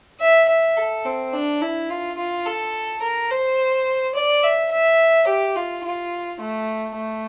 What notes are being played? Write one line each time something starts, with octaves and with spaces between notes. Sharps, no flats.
E5
E5
A4
C4
D4
E4
F4
F4
A4
A#4
C5
D5
E5
E5
G4
F4
F4
A3
A3